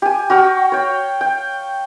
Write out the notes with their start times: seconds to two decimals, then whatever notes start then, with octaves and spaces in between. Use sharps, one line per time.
0.02 G4 G#5
0.30 F#4 F5 G5 C#6
0.72 C#5 G5
1.21 G5